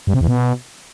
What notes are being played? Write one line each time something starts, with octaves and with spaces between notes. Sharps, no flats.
G2
C3
E2
B2